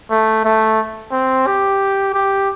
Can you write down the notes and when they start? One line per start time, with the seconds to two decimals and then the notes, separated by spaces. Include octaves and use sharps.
0.10 A3
0.45 A3
1.11 C4
1.46 G4
2.14 G4